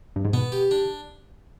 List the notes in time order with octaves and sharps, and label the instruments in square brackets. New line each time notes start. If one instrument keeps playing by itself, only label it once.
[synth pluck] G2
G#2
[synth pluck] B2 [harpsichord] B3
[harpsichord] G4
D4